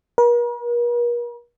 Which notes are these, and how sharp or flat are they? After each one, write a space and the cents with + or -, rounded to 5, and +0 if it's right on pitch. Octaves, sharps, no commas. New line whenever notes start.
A#4 +45